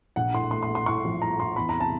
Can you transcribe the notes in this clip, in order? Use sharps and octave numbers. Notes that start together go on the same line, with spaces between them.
A#1 F#5
A2 C6
A3 C6
C6
A3
C6
A2 C#6
F3
A2 A#5
A2 C6
E2 B5
A#5
C3
A5